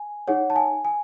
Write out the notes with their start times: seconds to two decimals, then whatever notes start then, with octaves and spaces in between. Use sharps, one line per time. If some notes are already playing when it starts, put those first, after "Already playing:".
Already playing: G#5
0.28 D#4 G#4 C#5 F#5
0.50 A5
0.56 G#5
0.85 G#5